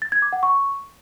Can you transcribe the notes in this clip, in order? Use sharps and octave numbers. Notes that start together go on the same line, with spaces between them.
A6
G#6
D6
F#5
C#6